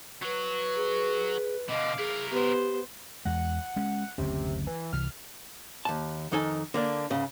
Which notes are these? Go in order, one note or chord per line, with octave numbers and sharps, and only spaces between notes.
F#3 F#4 B4
G#4
B2 D3 D#5 F5 D6
E4 G#4 A#4
B3 G4 C5
E2 G#3 F#5
G#3 C#4
F#1 D2 C3 C#4
E3
C2 E3 F6
D#2 A5
F2 D#3 D#4 A4 G#5
D3 A#3 D4
C#2 G#2 C#3